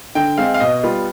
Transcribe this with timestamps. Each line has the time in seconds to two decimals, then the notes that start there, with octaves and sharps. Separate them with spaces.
0.15 D3 G5
0.38 G#3 C4 F5
0.54 F5
0.60 B2 D#5
0.83 G3 B3 F4